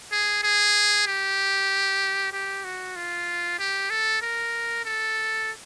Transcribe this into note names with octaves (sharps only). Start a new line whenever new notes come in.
G#4
G#4
G4
G4
F#4
F4
G4
A4
A#4
A4